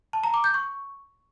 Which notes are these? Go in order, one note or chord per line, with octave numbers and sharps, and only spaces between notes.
A5
A#5
D6
G6
C#6